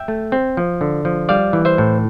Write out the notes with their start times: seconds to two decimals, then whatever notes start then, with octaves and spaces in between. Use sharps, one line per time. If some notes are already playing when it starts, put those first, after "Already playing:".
Already playing: E5 G5
0.08 A3
0.32 C4
0.57 F3
0.81 D3
1.05 F3
1.29 G3 D5 F5
1.53 E3
1.65 C5 E5
1.78 A2